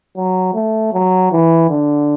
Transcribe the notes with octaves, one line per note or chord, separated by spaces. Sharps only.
F#3
A3
F#3
E3
D3